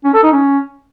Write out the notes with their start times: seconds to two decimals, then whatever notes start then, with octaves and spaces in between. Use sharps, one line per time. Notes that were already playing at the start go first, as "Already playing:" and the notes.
0.04 C#4
0.14 A4
0.23 D#4
0.32 C#4